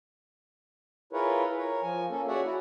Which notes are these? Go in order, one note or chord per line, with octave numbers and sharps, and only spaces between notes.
E4 F4 G#4 A#4 B4 C#5
A#4 C#5
F3 G#5
A#3 C#4 A4
F#4 G#4 C#5 D5 E5 F#5
E4 F#4